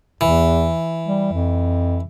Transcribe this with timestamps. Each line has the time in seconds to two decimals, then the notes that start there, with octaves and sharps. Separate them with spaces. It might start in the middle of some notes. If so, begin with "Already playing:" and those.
0.21 E2 E3
1.07 G3
1.32 F2